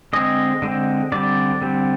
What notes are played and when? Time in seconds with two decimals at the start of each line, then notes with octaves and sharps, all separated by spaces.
0.13 D3 G#3 C4 D#5
0.62 D3 G#3 C4
1.12 D3 G3 C4 D5
1.62 D3 G3 C4